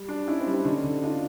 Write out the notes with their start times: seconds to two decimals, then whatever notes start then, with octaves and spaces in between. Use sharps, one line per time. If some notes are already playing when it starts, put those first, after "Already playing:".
Already playing: G3
0.09 D4
0.27 C#4 D#4 E4
0.40 C4 D4
0.46 G3
0.52 C4 D4
0.65 D3 C#4 D#4
0.84 D3
1.03 D4 D#4 F4